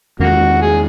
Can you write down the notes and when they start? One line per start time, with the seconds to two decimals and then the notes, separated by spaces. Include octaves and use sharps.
0.20 E2 D#3 G#3 A#3 C#4 F#4
0.62 G#4